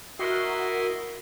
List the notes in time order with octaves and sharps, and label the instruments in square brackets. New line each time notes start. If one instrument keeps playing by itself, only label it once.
[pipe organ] E4 D#5 C6 [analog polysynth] F#4 A#4